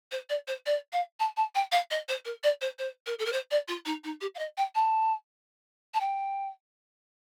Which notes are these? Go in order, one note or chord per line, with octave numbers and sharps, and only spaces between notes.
C5
D5
C5
D5
F5
A5
A5
G5
F5
D#5
C5
A#4
D5
C5
C5
A#4
A4
A#4
C5
D5
F4
D#4
D#4
G4
F5
D#5
G5
A5
A5
G5